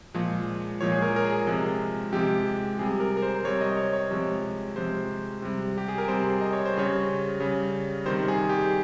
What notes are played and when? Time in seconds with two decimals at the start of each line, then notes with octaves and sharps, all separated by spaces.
0.14 A#2 F3 G#3
0.81 A#2 F3 G#3 C#5
0.92 G#4
1.02 A#4
1.16 A#4
1.24 G#4
1.47 C3 F3 G#3
2.13 C3 F3 G#3 G4
2.79 C3 G3 G#4
3.00 A#4
3.17 A#4
3.22 C5
3.44 C3 G3 C#5
3.61 D#5
3.77 C#5
3.93 C#5
4.11 C3 F3 G#3
4.76 C3 F3 G#3 C5
5.42 C3 G3
5.78 G4
5.88 G#4
5.98 A#4
6.08 C3 G3 C5
6.41 D#5
6.53 C#5
6.65 C5
6.74 C#3 G3 C#5
7.40 C#3 G3
8.05 C3 D#3 G3 C5
8.28 G#4
8.49 G4